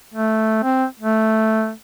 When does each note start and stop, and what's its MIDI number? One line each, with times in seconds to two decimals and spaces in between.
0.14 0.58 57
0.63 0.85 60
1.00 1.72 57